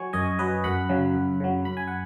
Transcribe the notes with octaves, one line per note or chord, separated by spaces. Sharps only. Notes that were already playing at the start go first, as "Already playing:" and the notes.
Already playing: F#3 G#5 C#6
F#2 D#5 G#5
F#3 B4 D#5
F#2 F#5 B5
C#3 F#3
F#2
C#3 F#3
F#2 B5
G#5
F#5